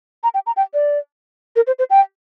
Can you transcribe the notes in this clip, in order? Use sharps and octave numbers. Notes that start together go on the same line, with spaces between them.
A#5
G5
A#5
G5
D5
A#4
C5
C5
G5